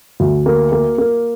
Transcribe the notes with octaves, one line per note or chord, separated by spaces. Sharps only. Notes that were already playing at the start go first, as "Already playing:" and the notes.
D2
A#3
A#3
A#3